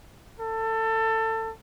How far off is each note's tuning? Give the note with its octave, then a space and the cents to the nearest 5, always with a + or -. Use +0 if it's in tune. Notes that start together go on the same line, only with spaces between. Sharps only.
A4 +20